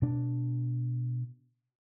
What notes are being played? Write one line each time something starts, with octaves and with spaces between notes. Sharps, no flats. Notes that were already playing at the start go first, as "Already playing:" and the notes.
B2 D4